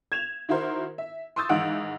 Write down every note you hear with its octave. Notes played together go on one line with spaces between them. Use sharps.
G#6 E7 F7
D#3 E4 F#4 A#4 C5
E5
C6 C#6 D#6 E6 G6 A6
G#2 D#3 E3 F5 F#5 D7